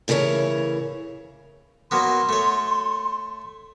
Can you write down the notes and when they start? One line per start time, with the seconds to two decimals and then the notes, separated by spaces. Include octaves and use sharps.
0.08 A2 C#3 E3 A#4 C#5
1.91 F#3 A#3 B3 C6
2.29 A3 C#5